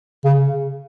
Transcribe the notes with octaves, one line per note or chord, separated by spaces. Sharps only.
C#3